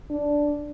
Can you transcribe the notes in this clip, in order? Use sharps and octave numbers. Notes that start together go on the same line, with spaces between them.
D4